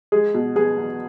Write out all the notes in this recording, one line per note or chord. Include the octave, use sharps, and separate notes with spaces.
G#3 G#4
B2
B3 G#4
E2